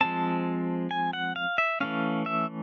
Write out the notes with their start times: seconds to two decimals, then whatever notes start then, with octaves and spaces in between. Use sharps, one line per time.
0.01 F3 G#3 C4 A5
0.91 G#5
1.13 F#5
1.36 F5
1.58 E5
1.80 E3 A3 C#4 F5
2.26 E5